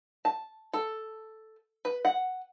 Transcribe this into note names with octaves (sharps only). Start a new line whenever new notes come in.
A5
A4
B4
F#5